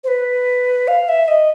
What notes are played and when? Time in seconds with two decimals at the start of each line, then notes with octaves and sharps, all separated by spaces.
0.04 C5
0.08 B4
0.88 F5
1.09 E5
1.28 D#5